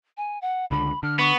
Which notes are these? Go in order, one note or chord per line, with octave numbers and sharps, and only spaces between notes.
G#5
F#5
C#2 D3 B5
D3 F6
B3 C#6